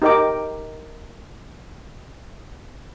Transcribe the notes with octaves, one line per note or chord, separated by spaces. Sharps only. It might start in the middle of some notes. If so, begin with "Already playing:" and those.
D#4 G4 A#4 D#5 G5 D6